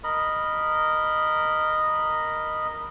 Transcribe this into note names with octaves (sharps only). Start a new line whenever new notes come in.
A#4 D#5 B5